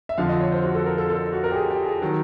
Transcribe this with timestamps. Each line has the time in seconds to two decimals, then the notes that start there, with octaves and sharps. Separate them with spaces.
0.09 E5
0.18 F2 D3 F3 F5
0.29 D#5
0.41 C#5
0.52 C5
0.64 F#4
0.75 A4
0.86 A#4
0.98 A4
1.10 A4
1.33 F#4
1.44 A#4
1.51 G4
1.55 G#4
1.71 G4
1.86 G#4
2.02 D#3 F#3